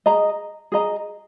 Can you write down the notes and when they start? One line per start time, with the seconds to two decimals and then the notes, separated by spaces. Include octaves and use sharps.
0.06 G#4 D#5 A#5
0.72 G#4 D#5 A#5